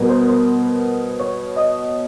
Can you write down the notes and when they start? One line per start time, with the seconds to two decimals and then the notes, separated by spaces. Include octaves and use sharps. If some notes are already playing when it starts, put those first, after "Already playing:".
Already playing: B2 G3 B3 A#4
0.09 C5
0.28 C5
1.20 C#5
1.56 D#5